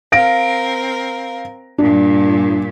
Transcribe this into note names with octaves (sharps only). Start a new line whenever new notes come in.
C4 A#4 F5 A#6 D7
G2 A#2 D4